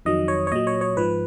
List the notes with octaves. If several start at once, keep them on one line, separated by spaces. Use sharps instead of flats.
F2 D#3 F#3 D#5
C#5
C#5
A#2 F#3 D#5
C#5
C#5
G#2 F3 B4